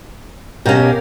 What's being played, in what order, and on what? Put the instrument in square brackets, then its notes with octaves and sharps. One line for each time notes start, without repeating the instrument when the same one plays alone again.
[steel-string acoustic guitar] B2 C#4 [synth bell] G4 A#4 F5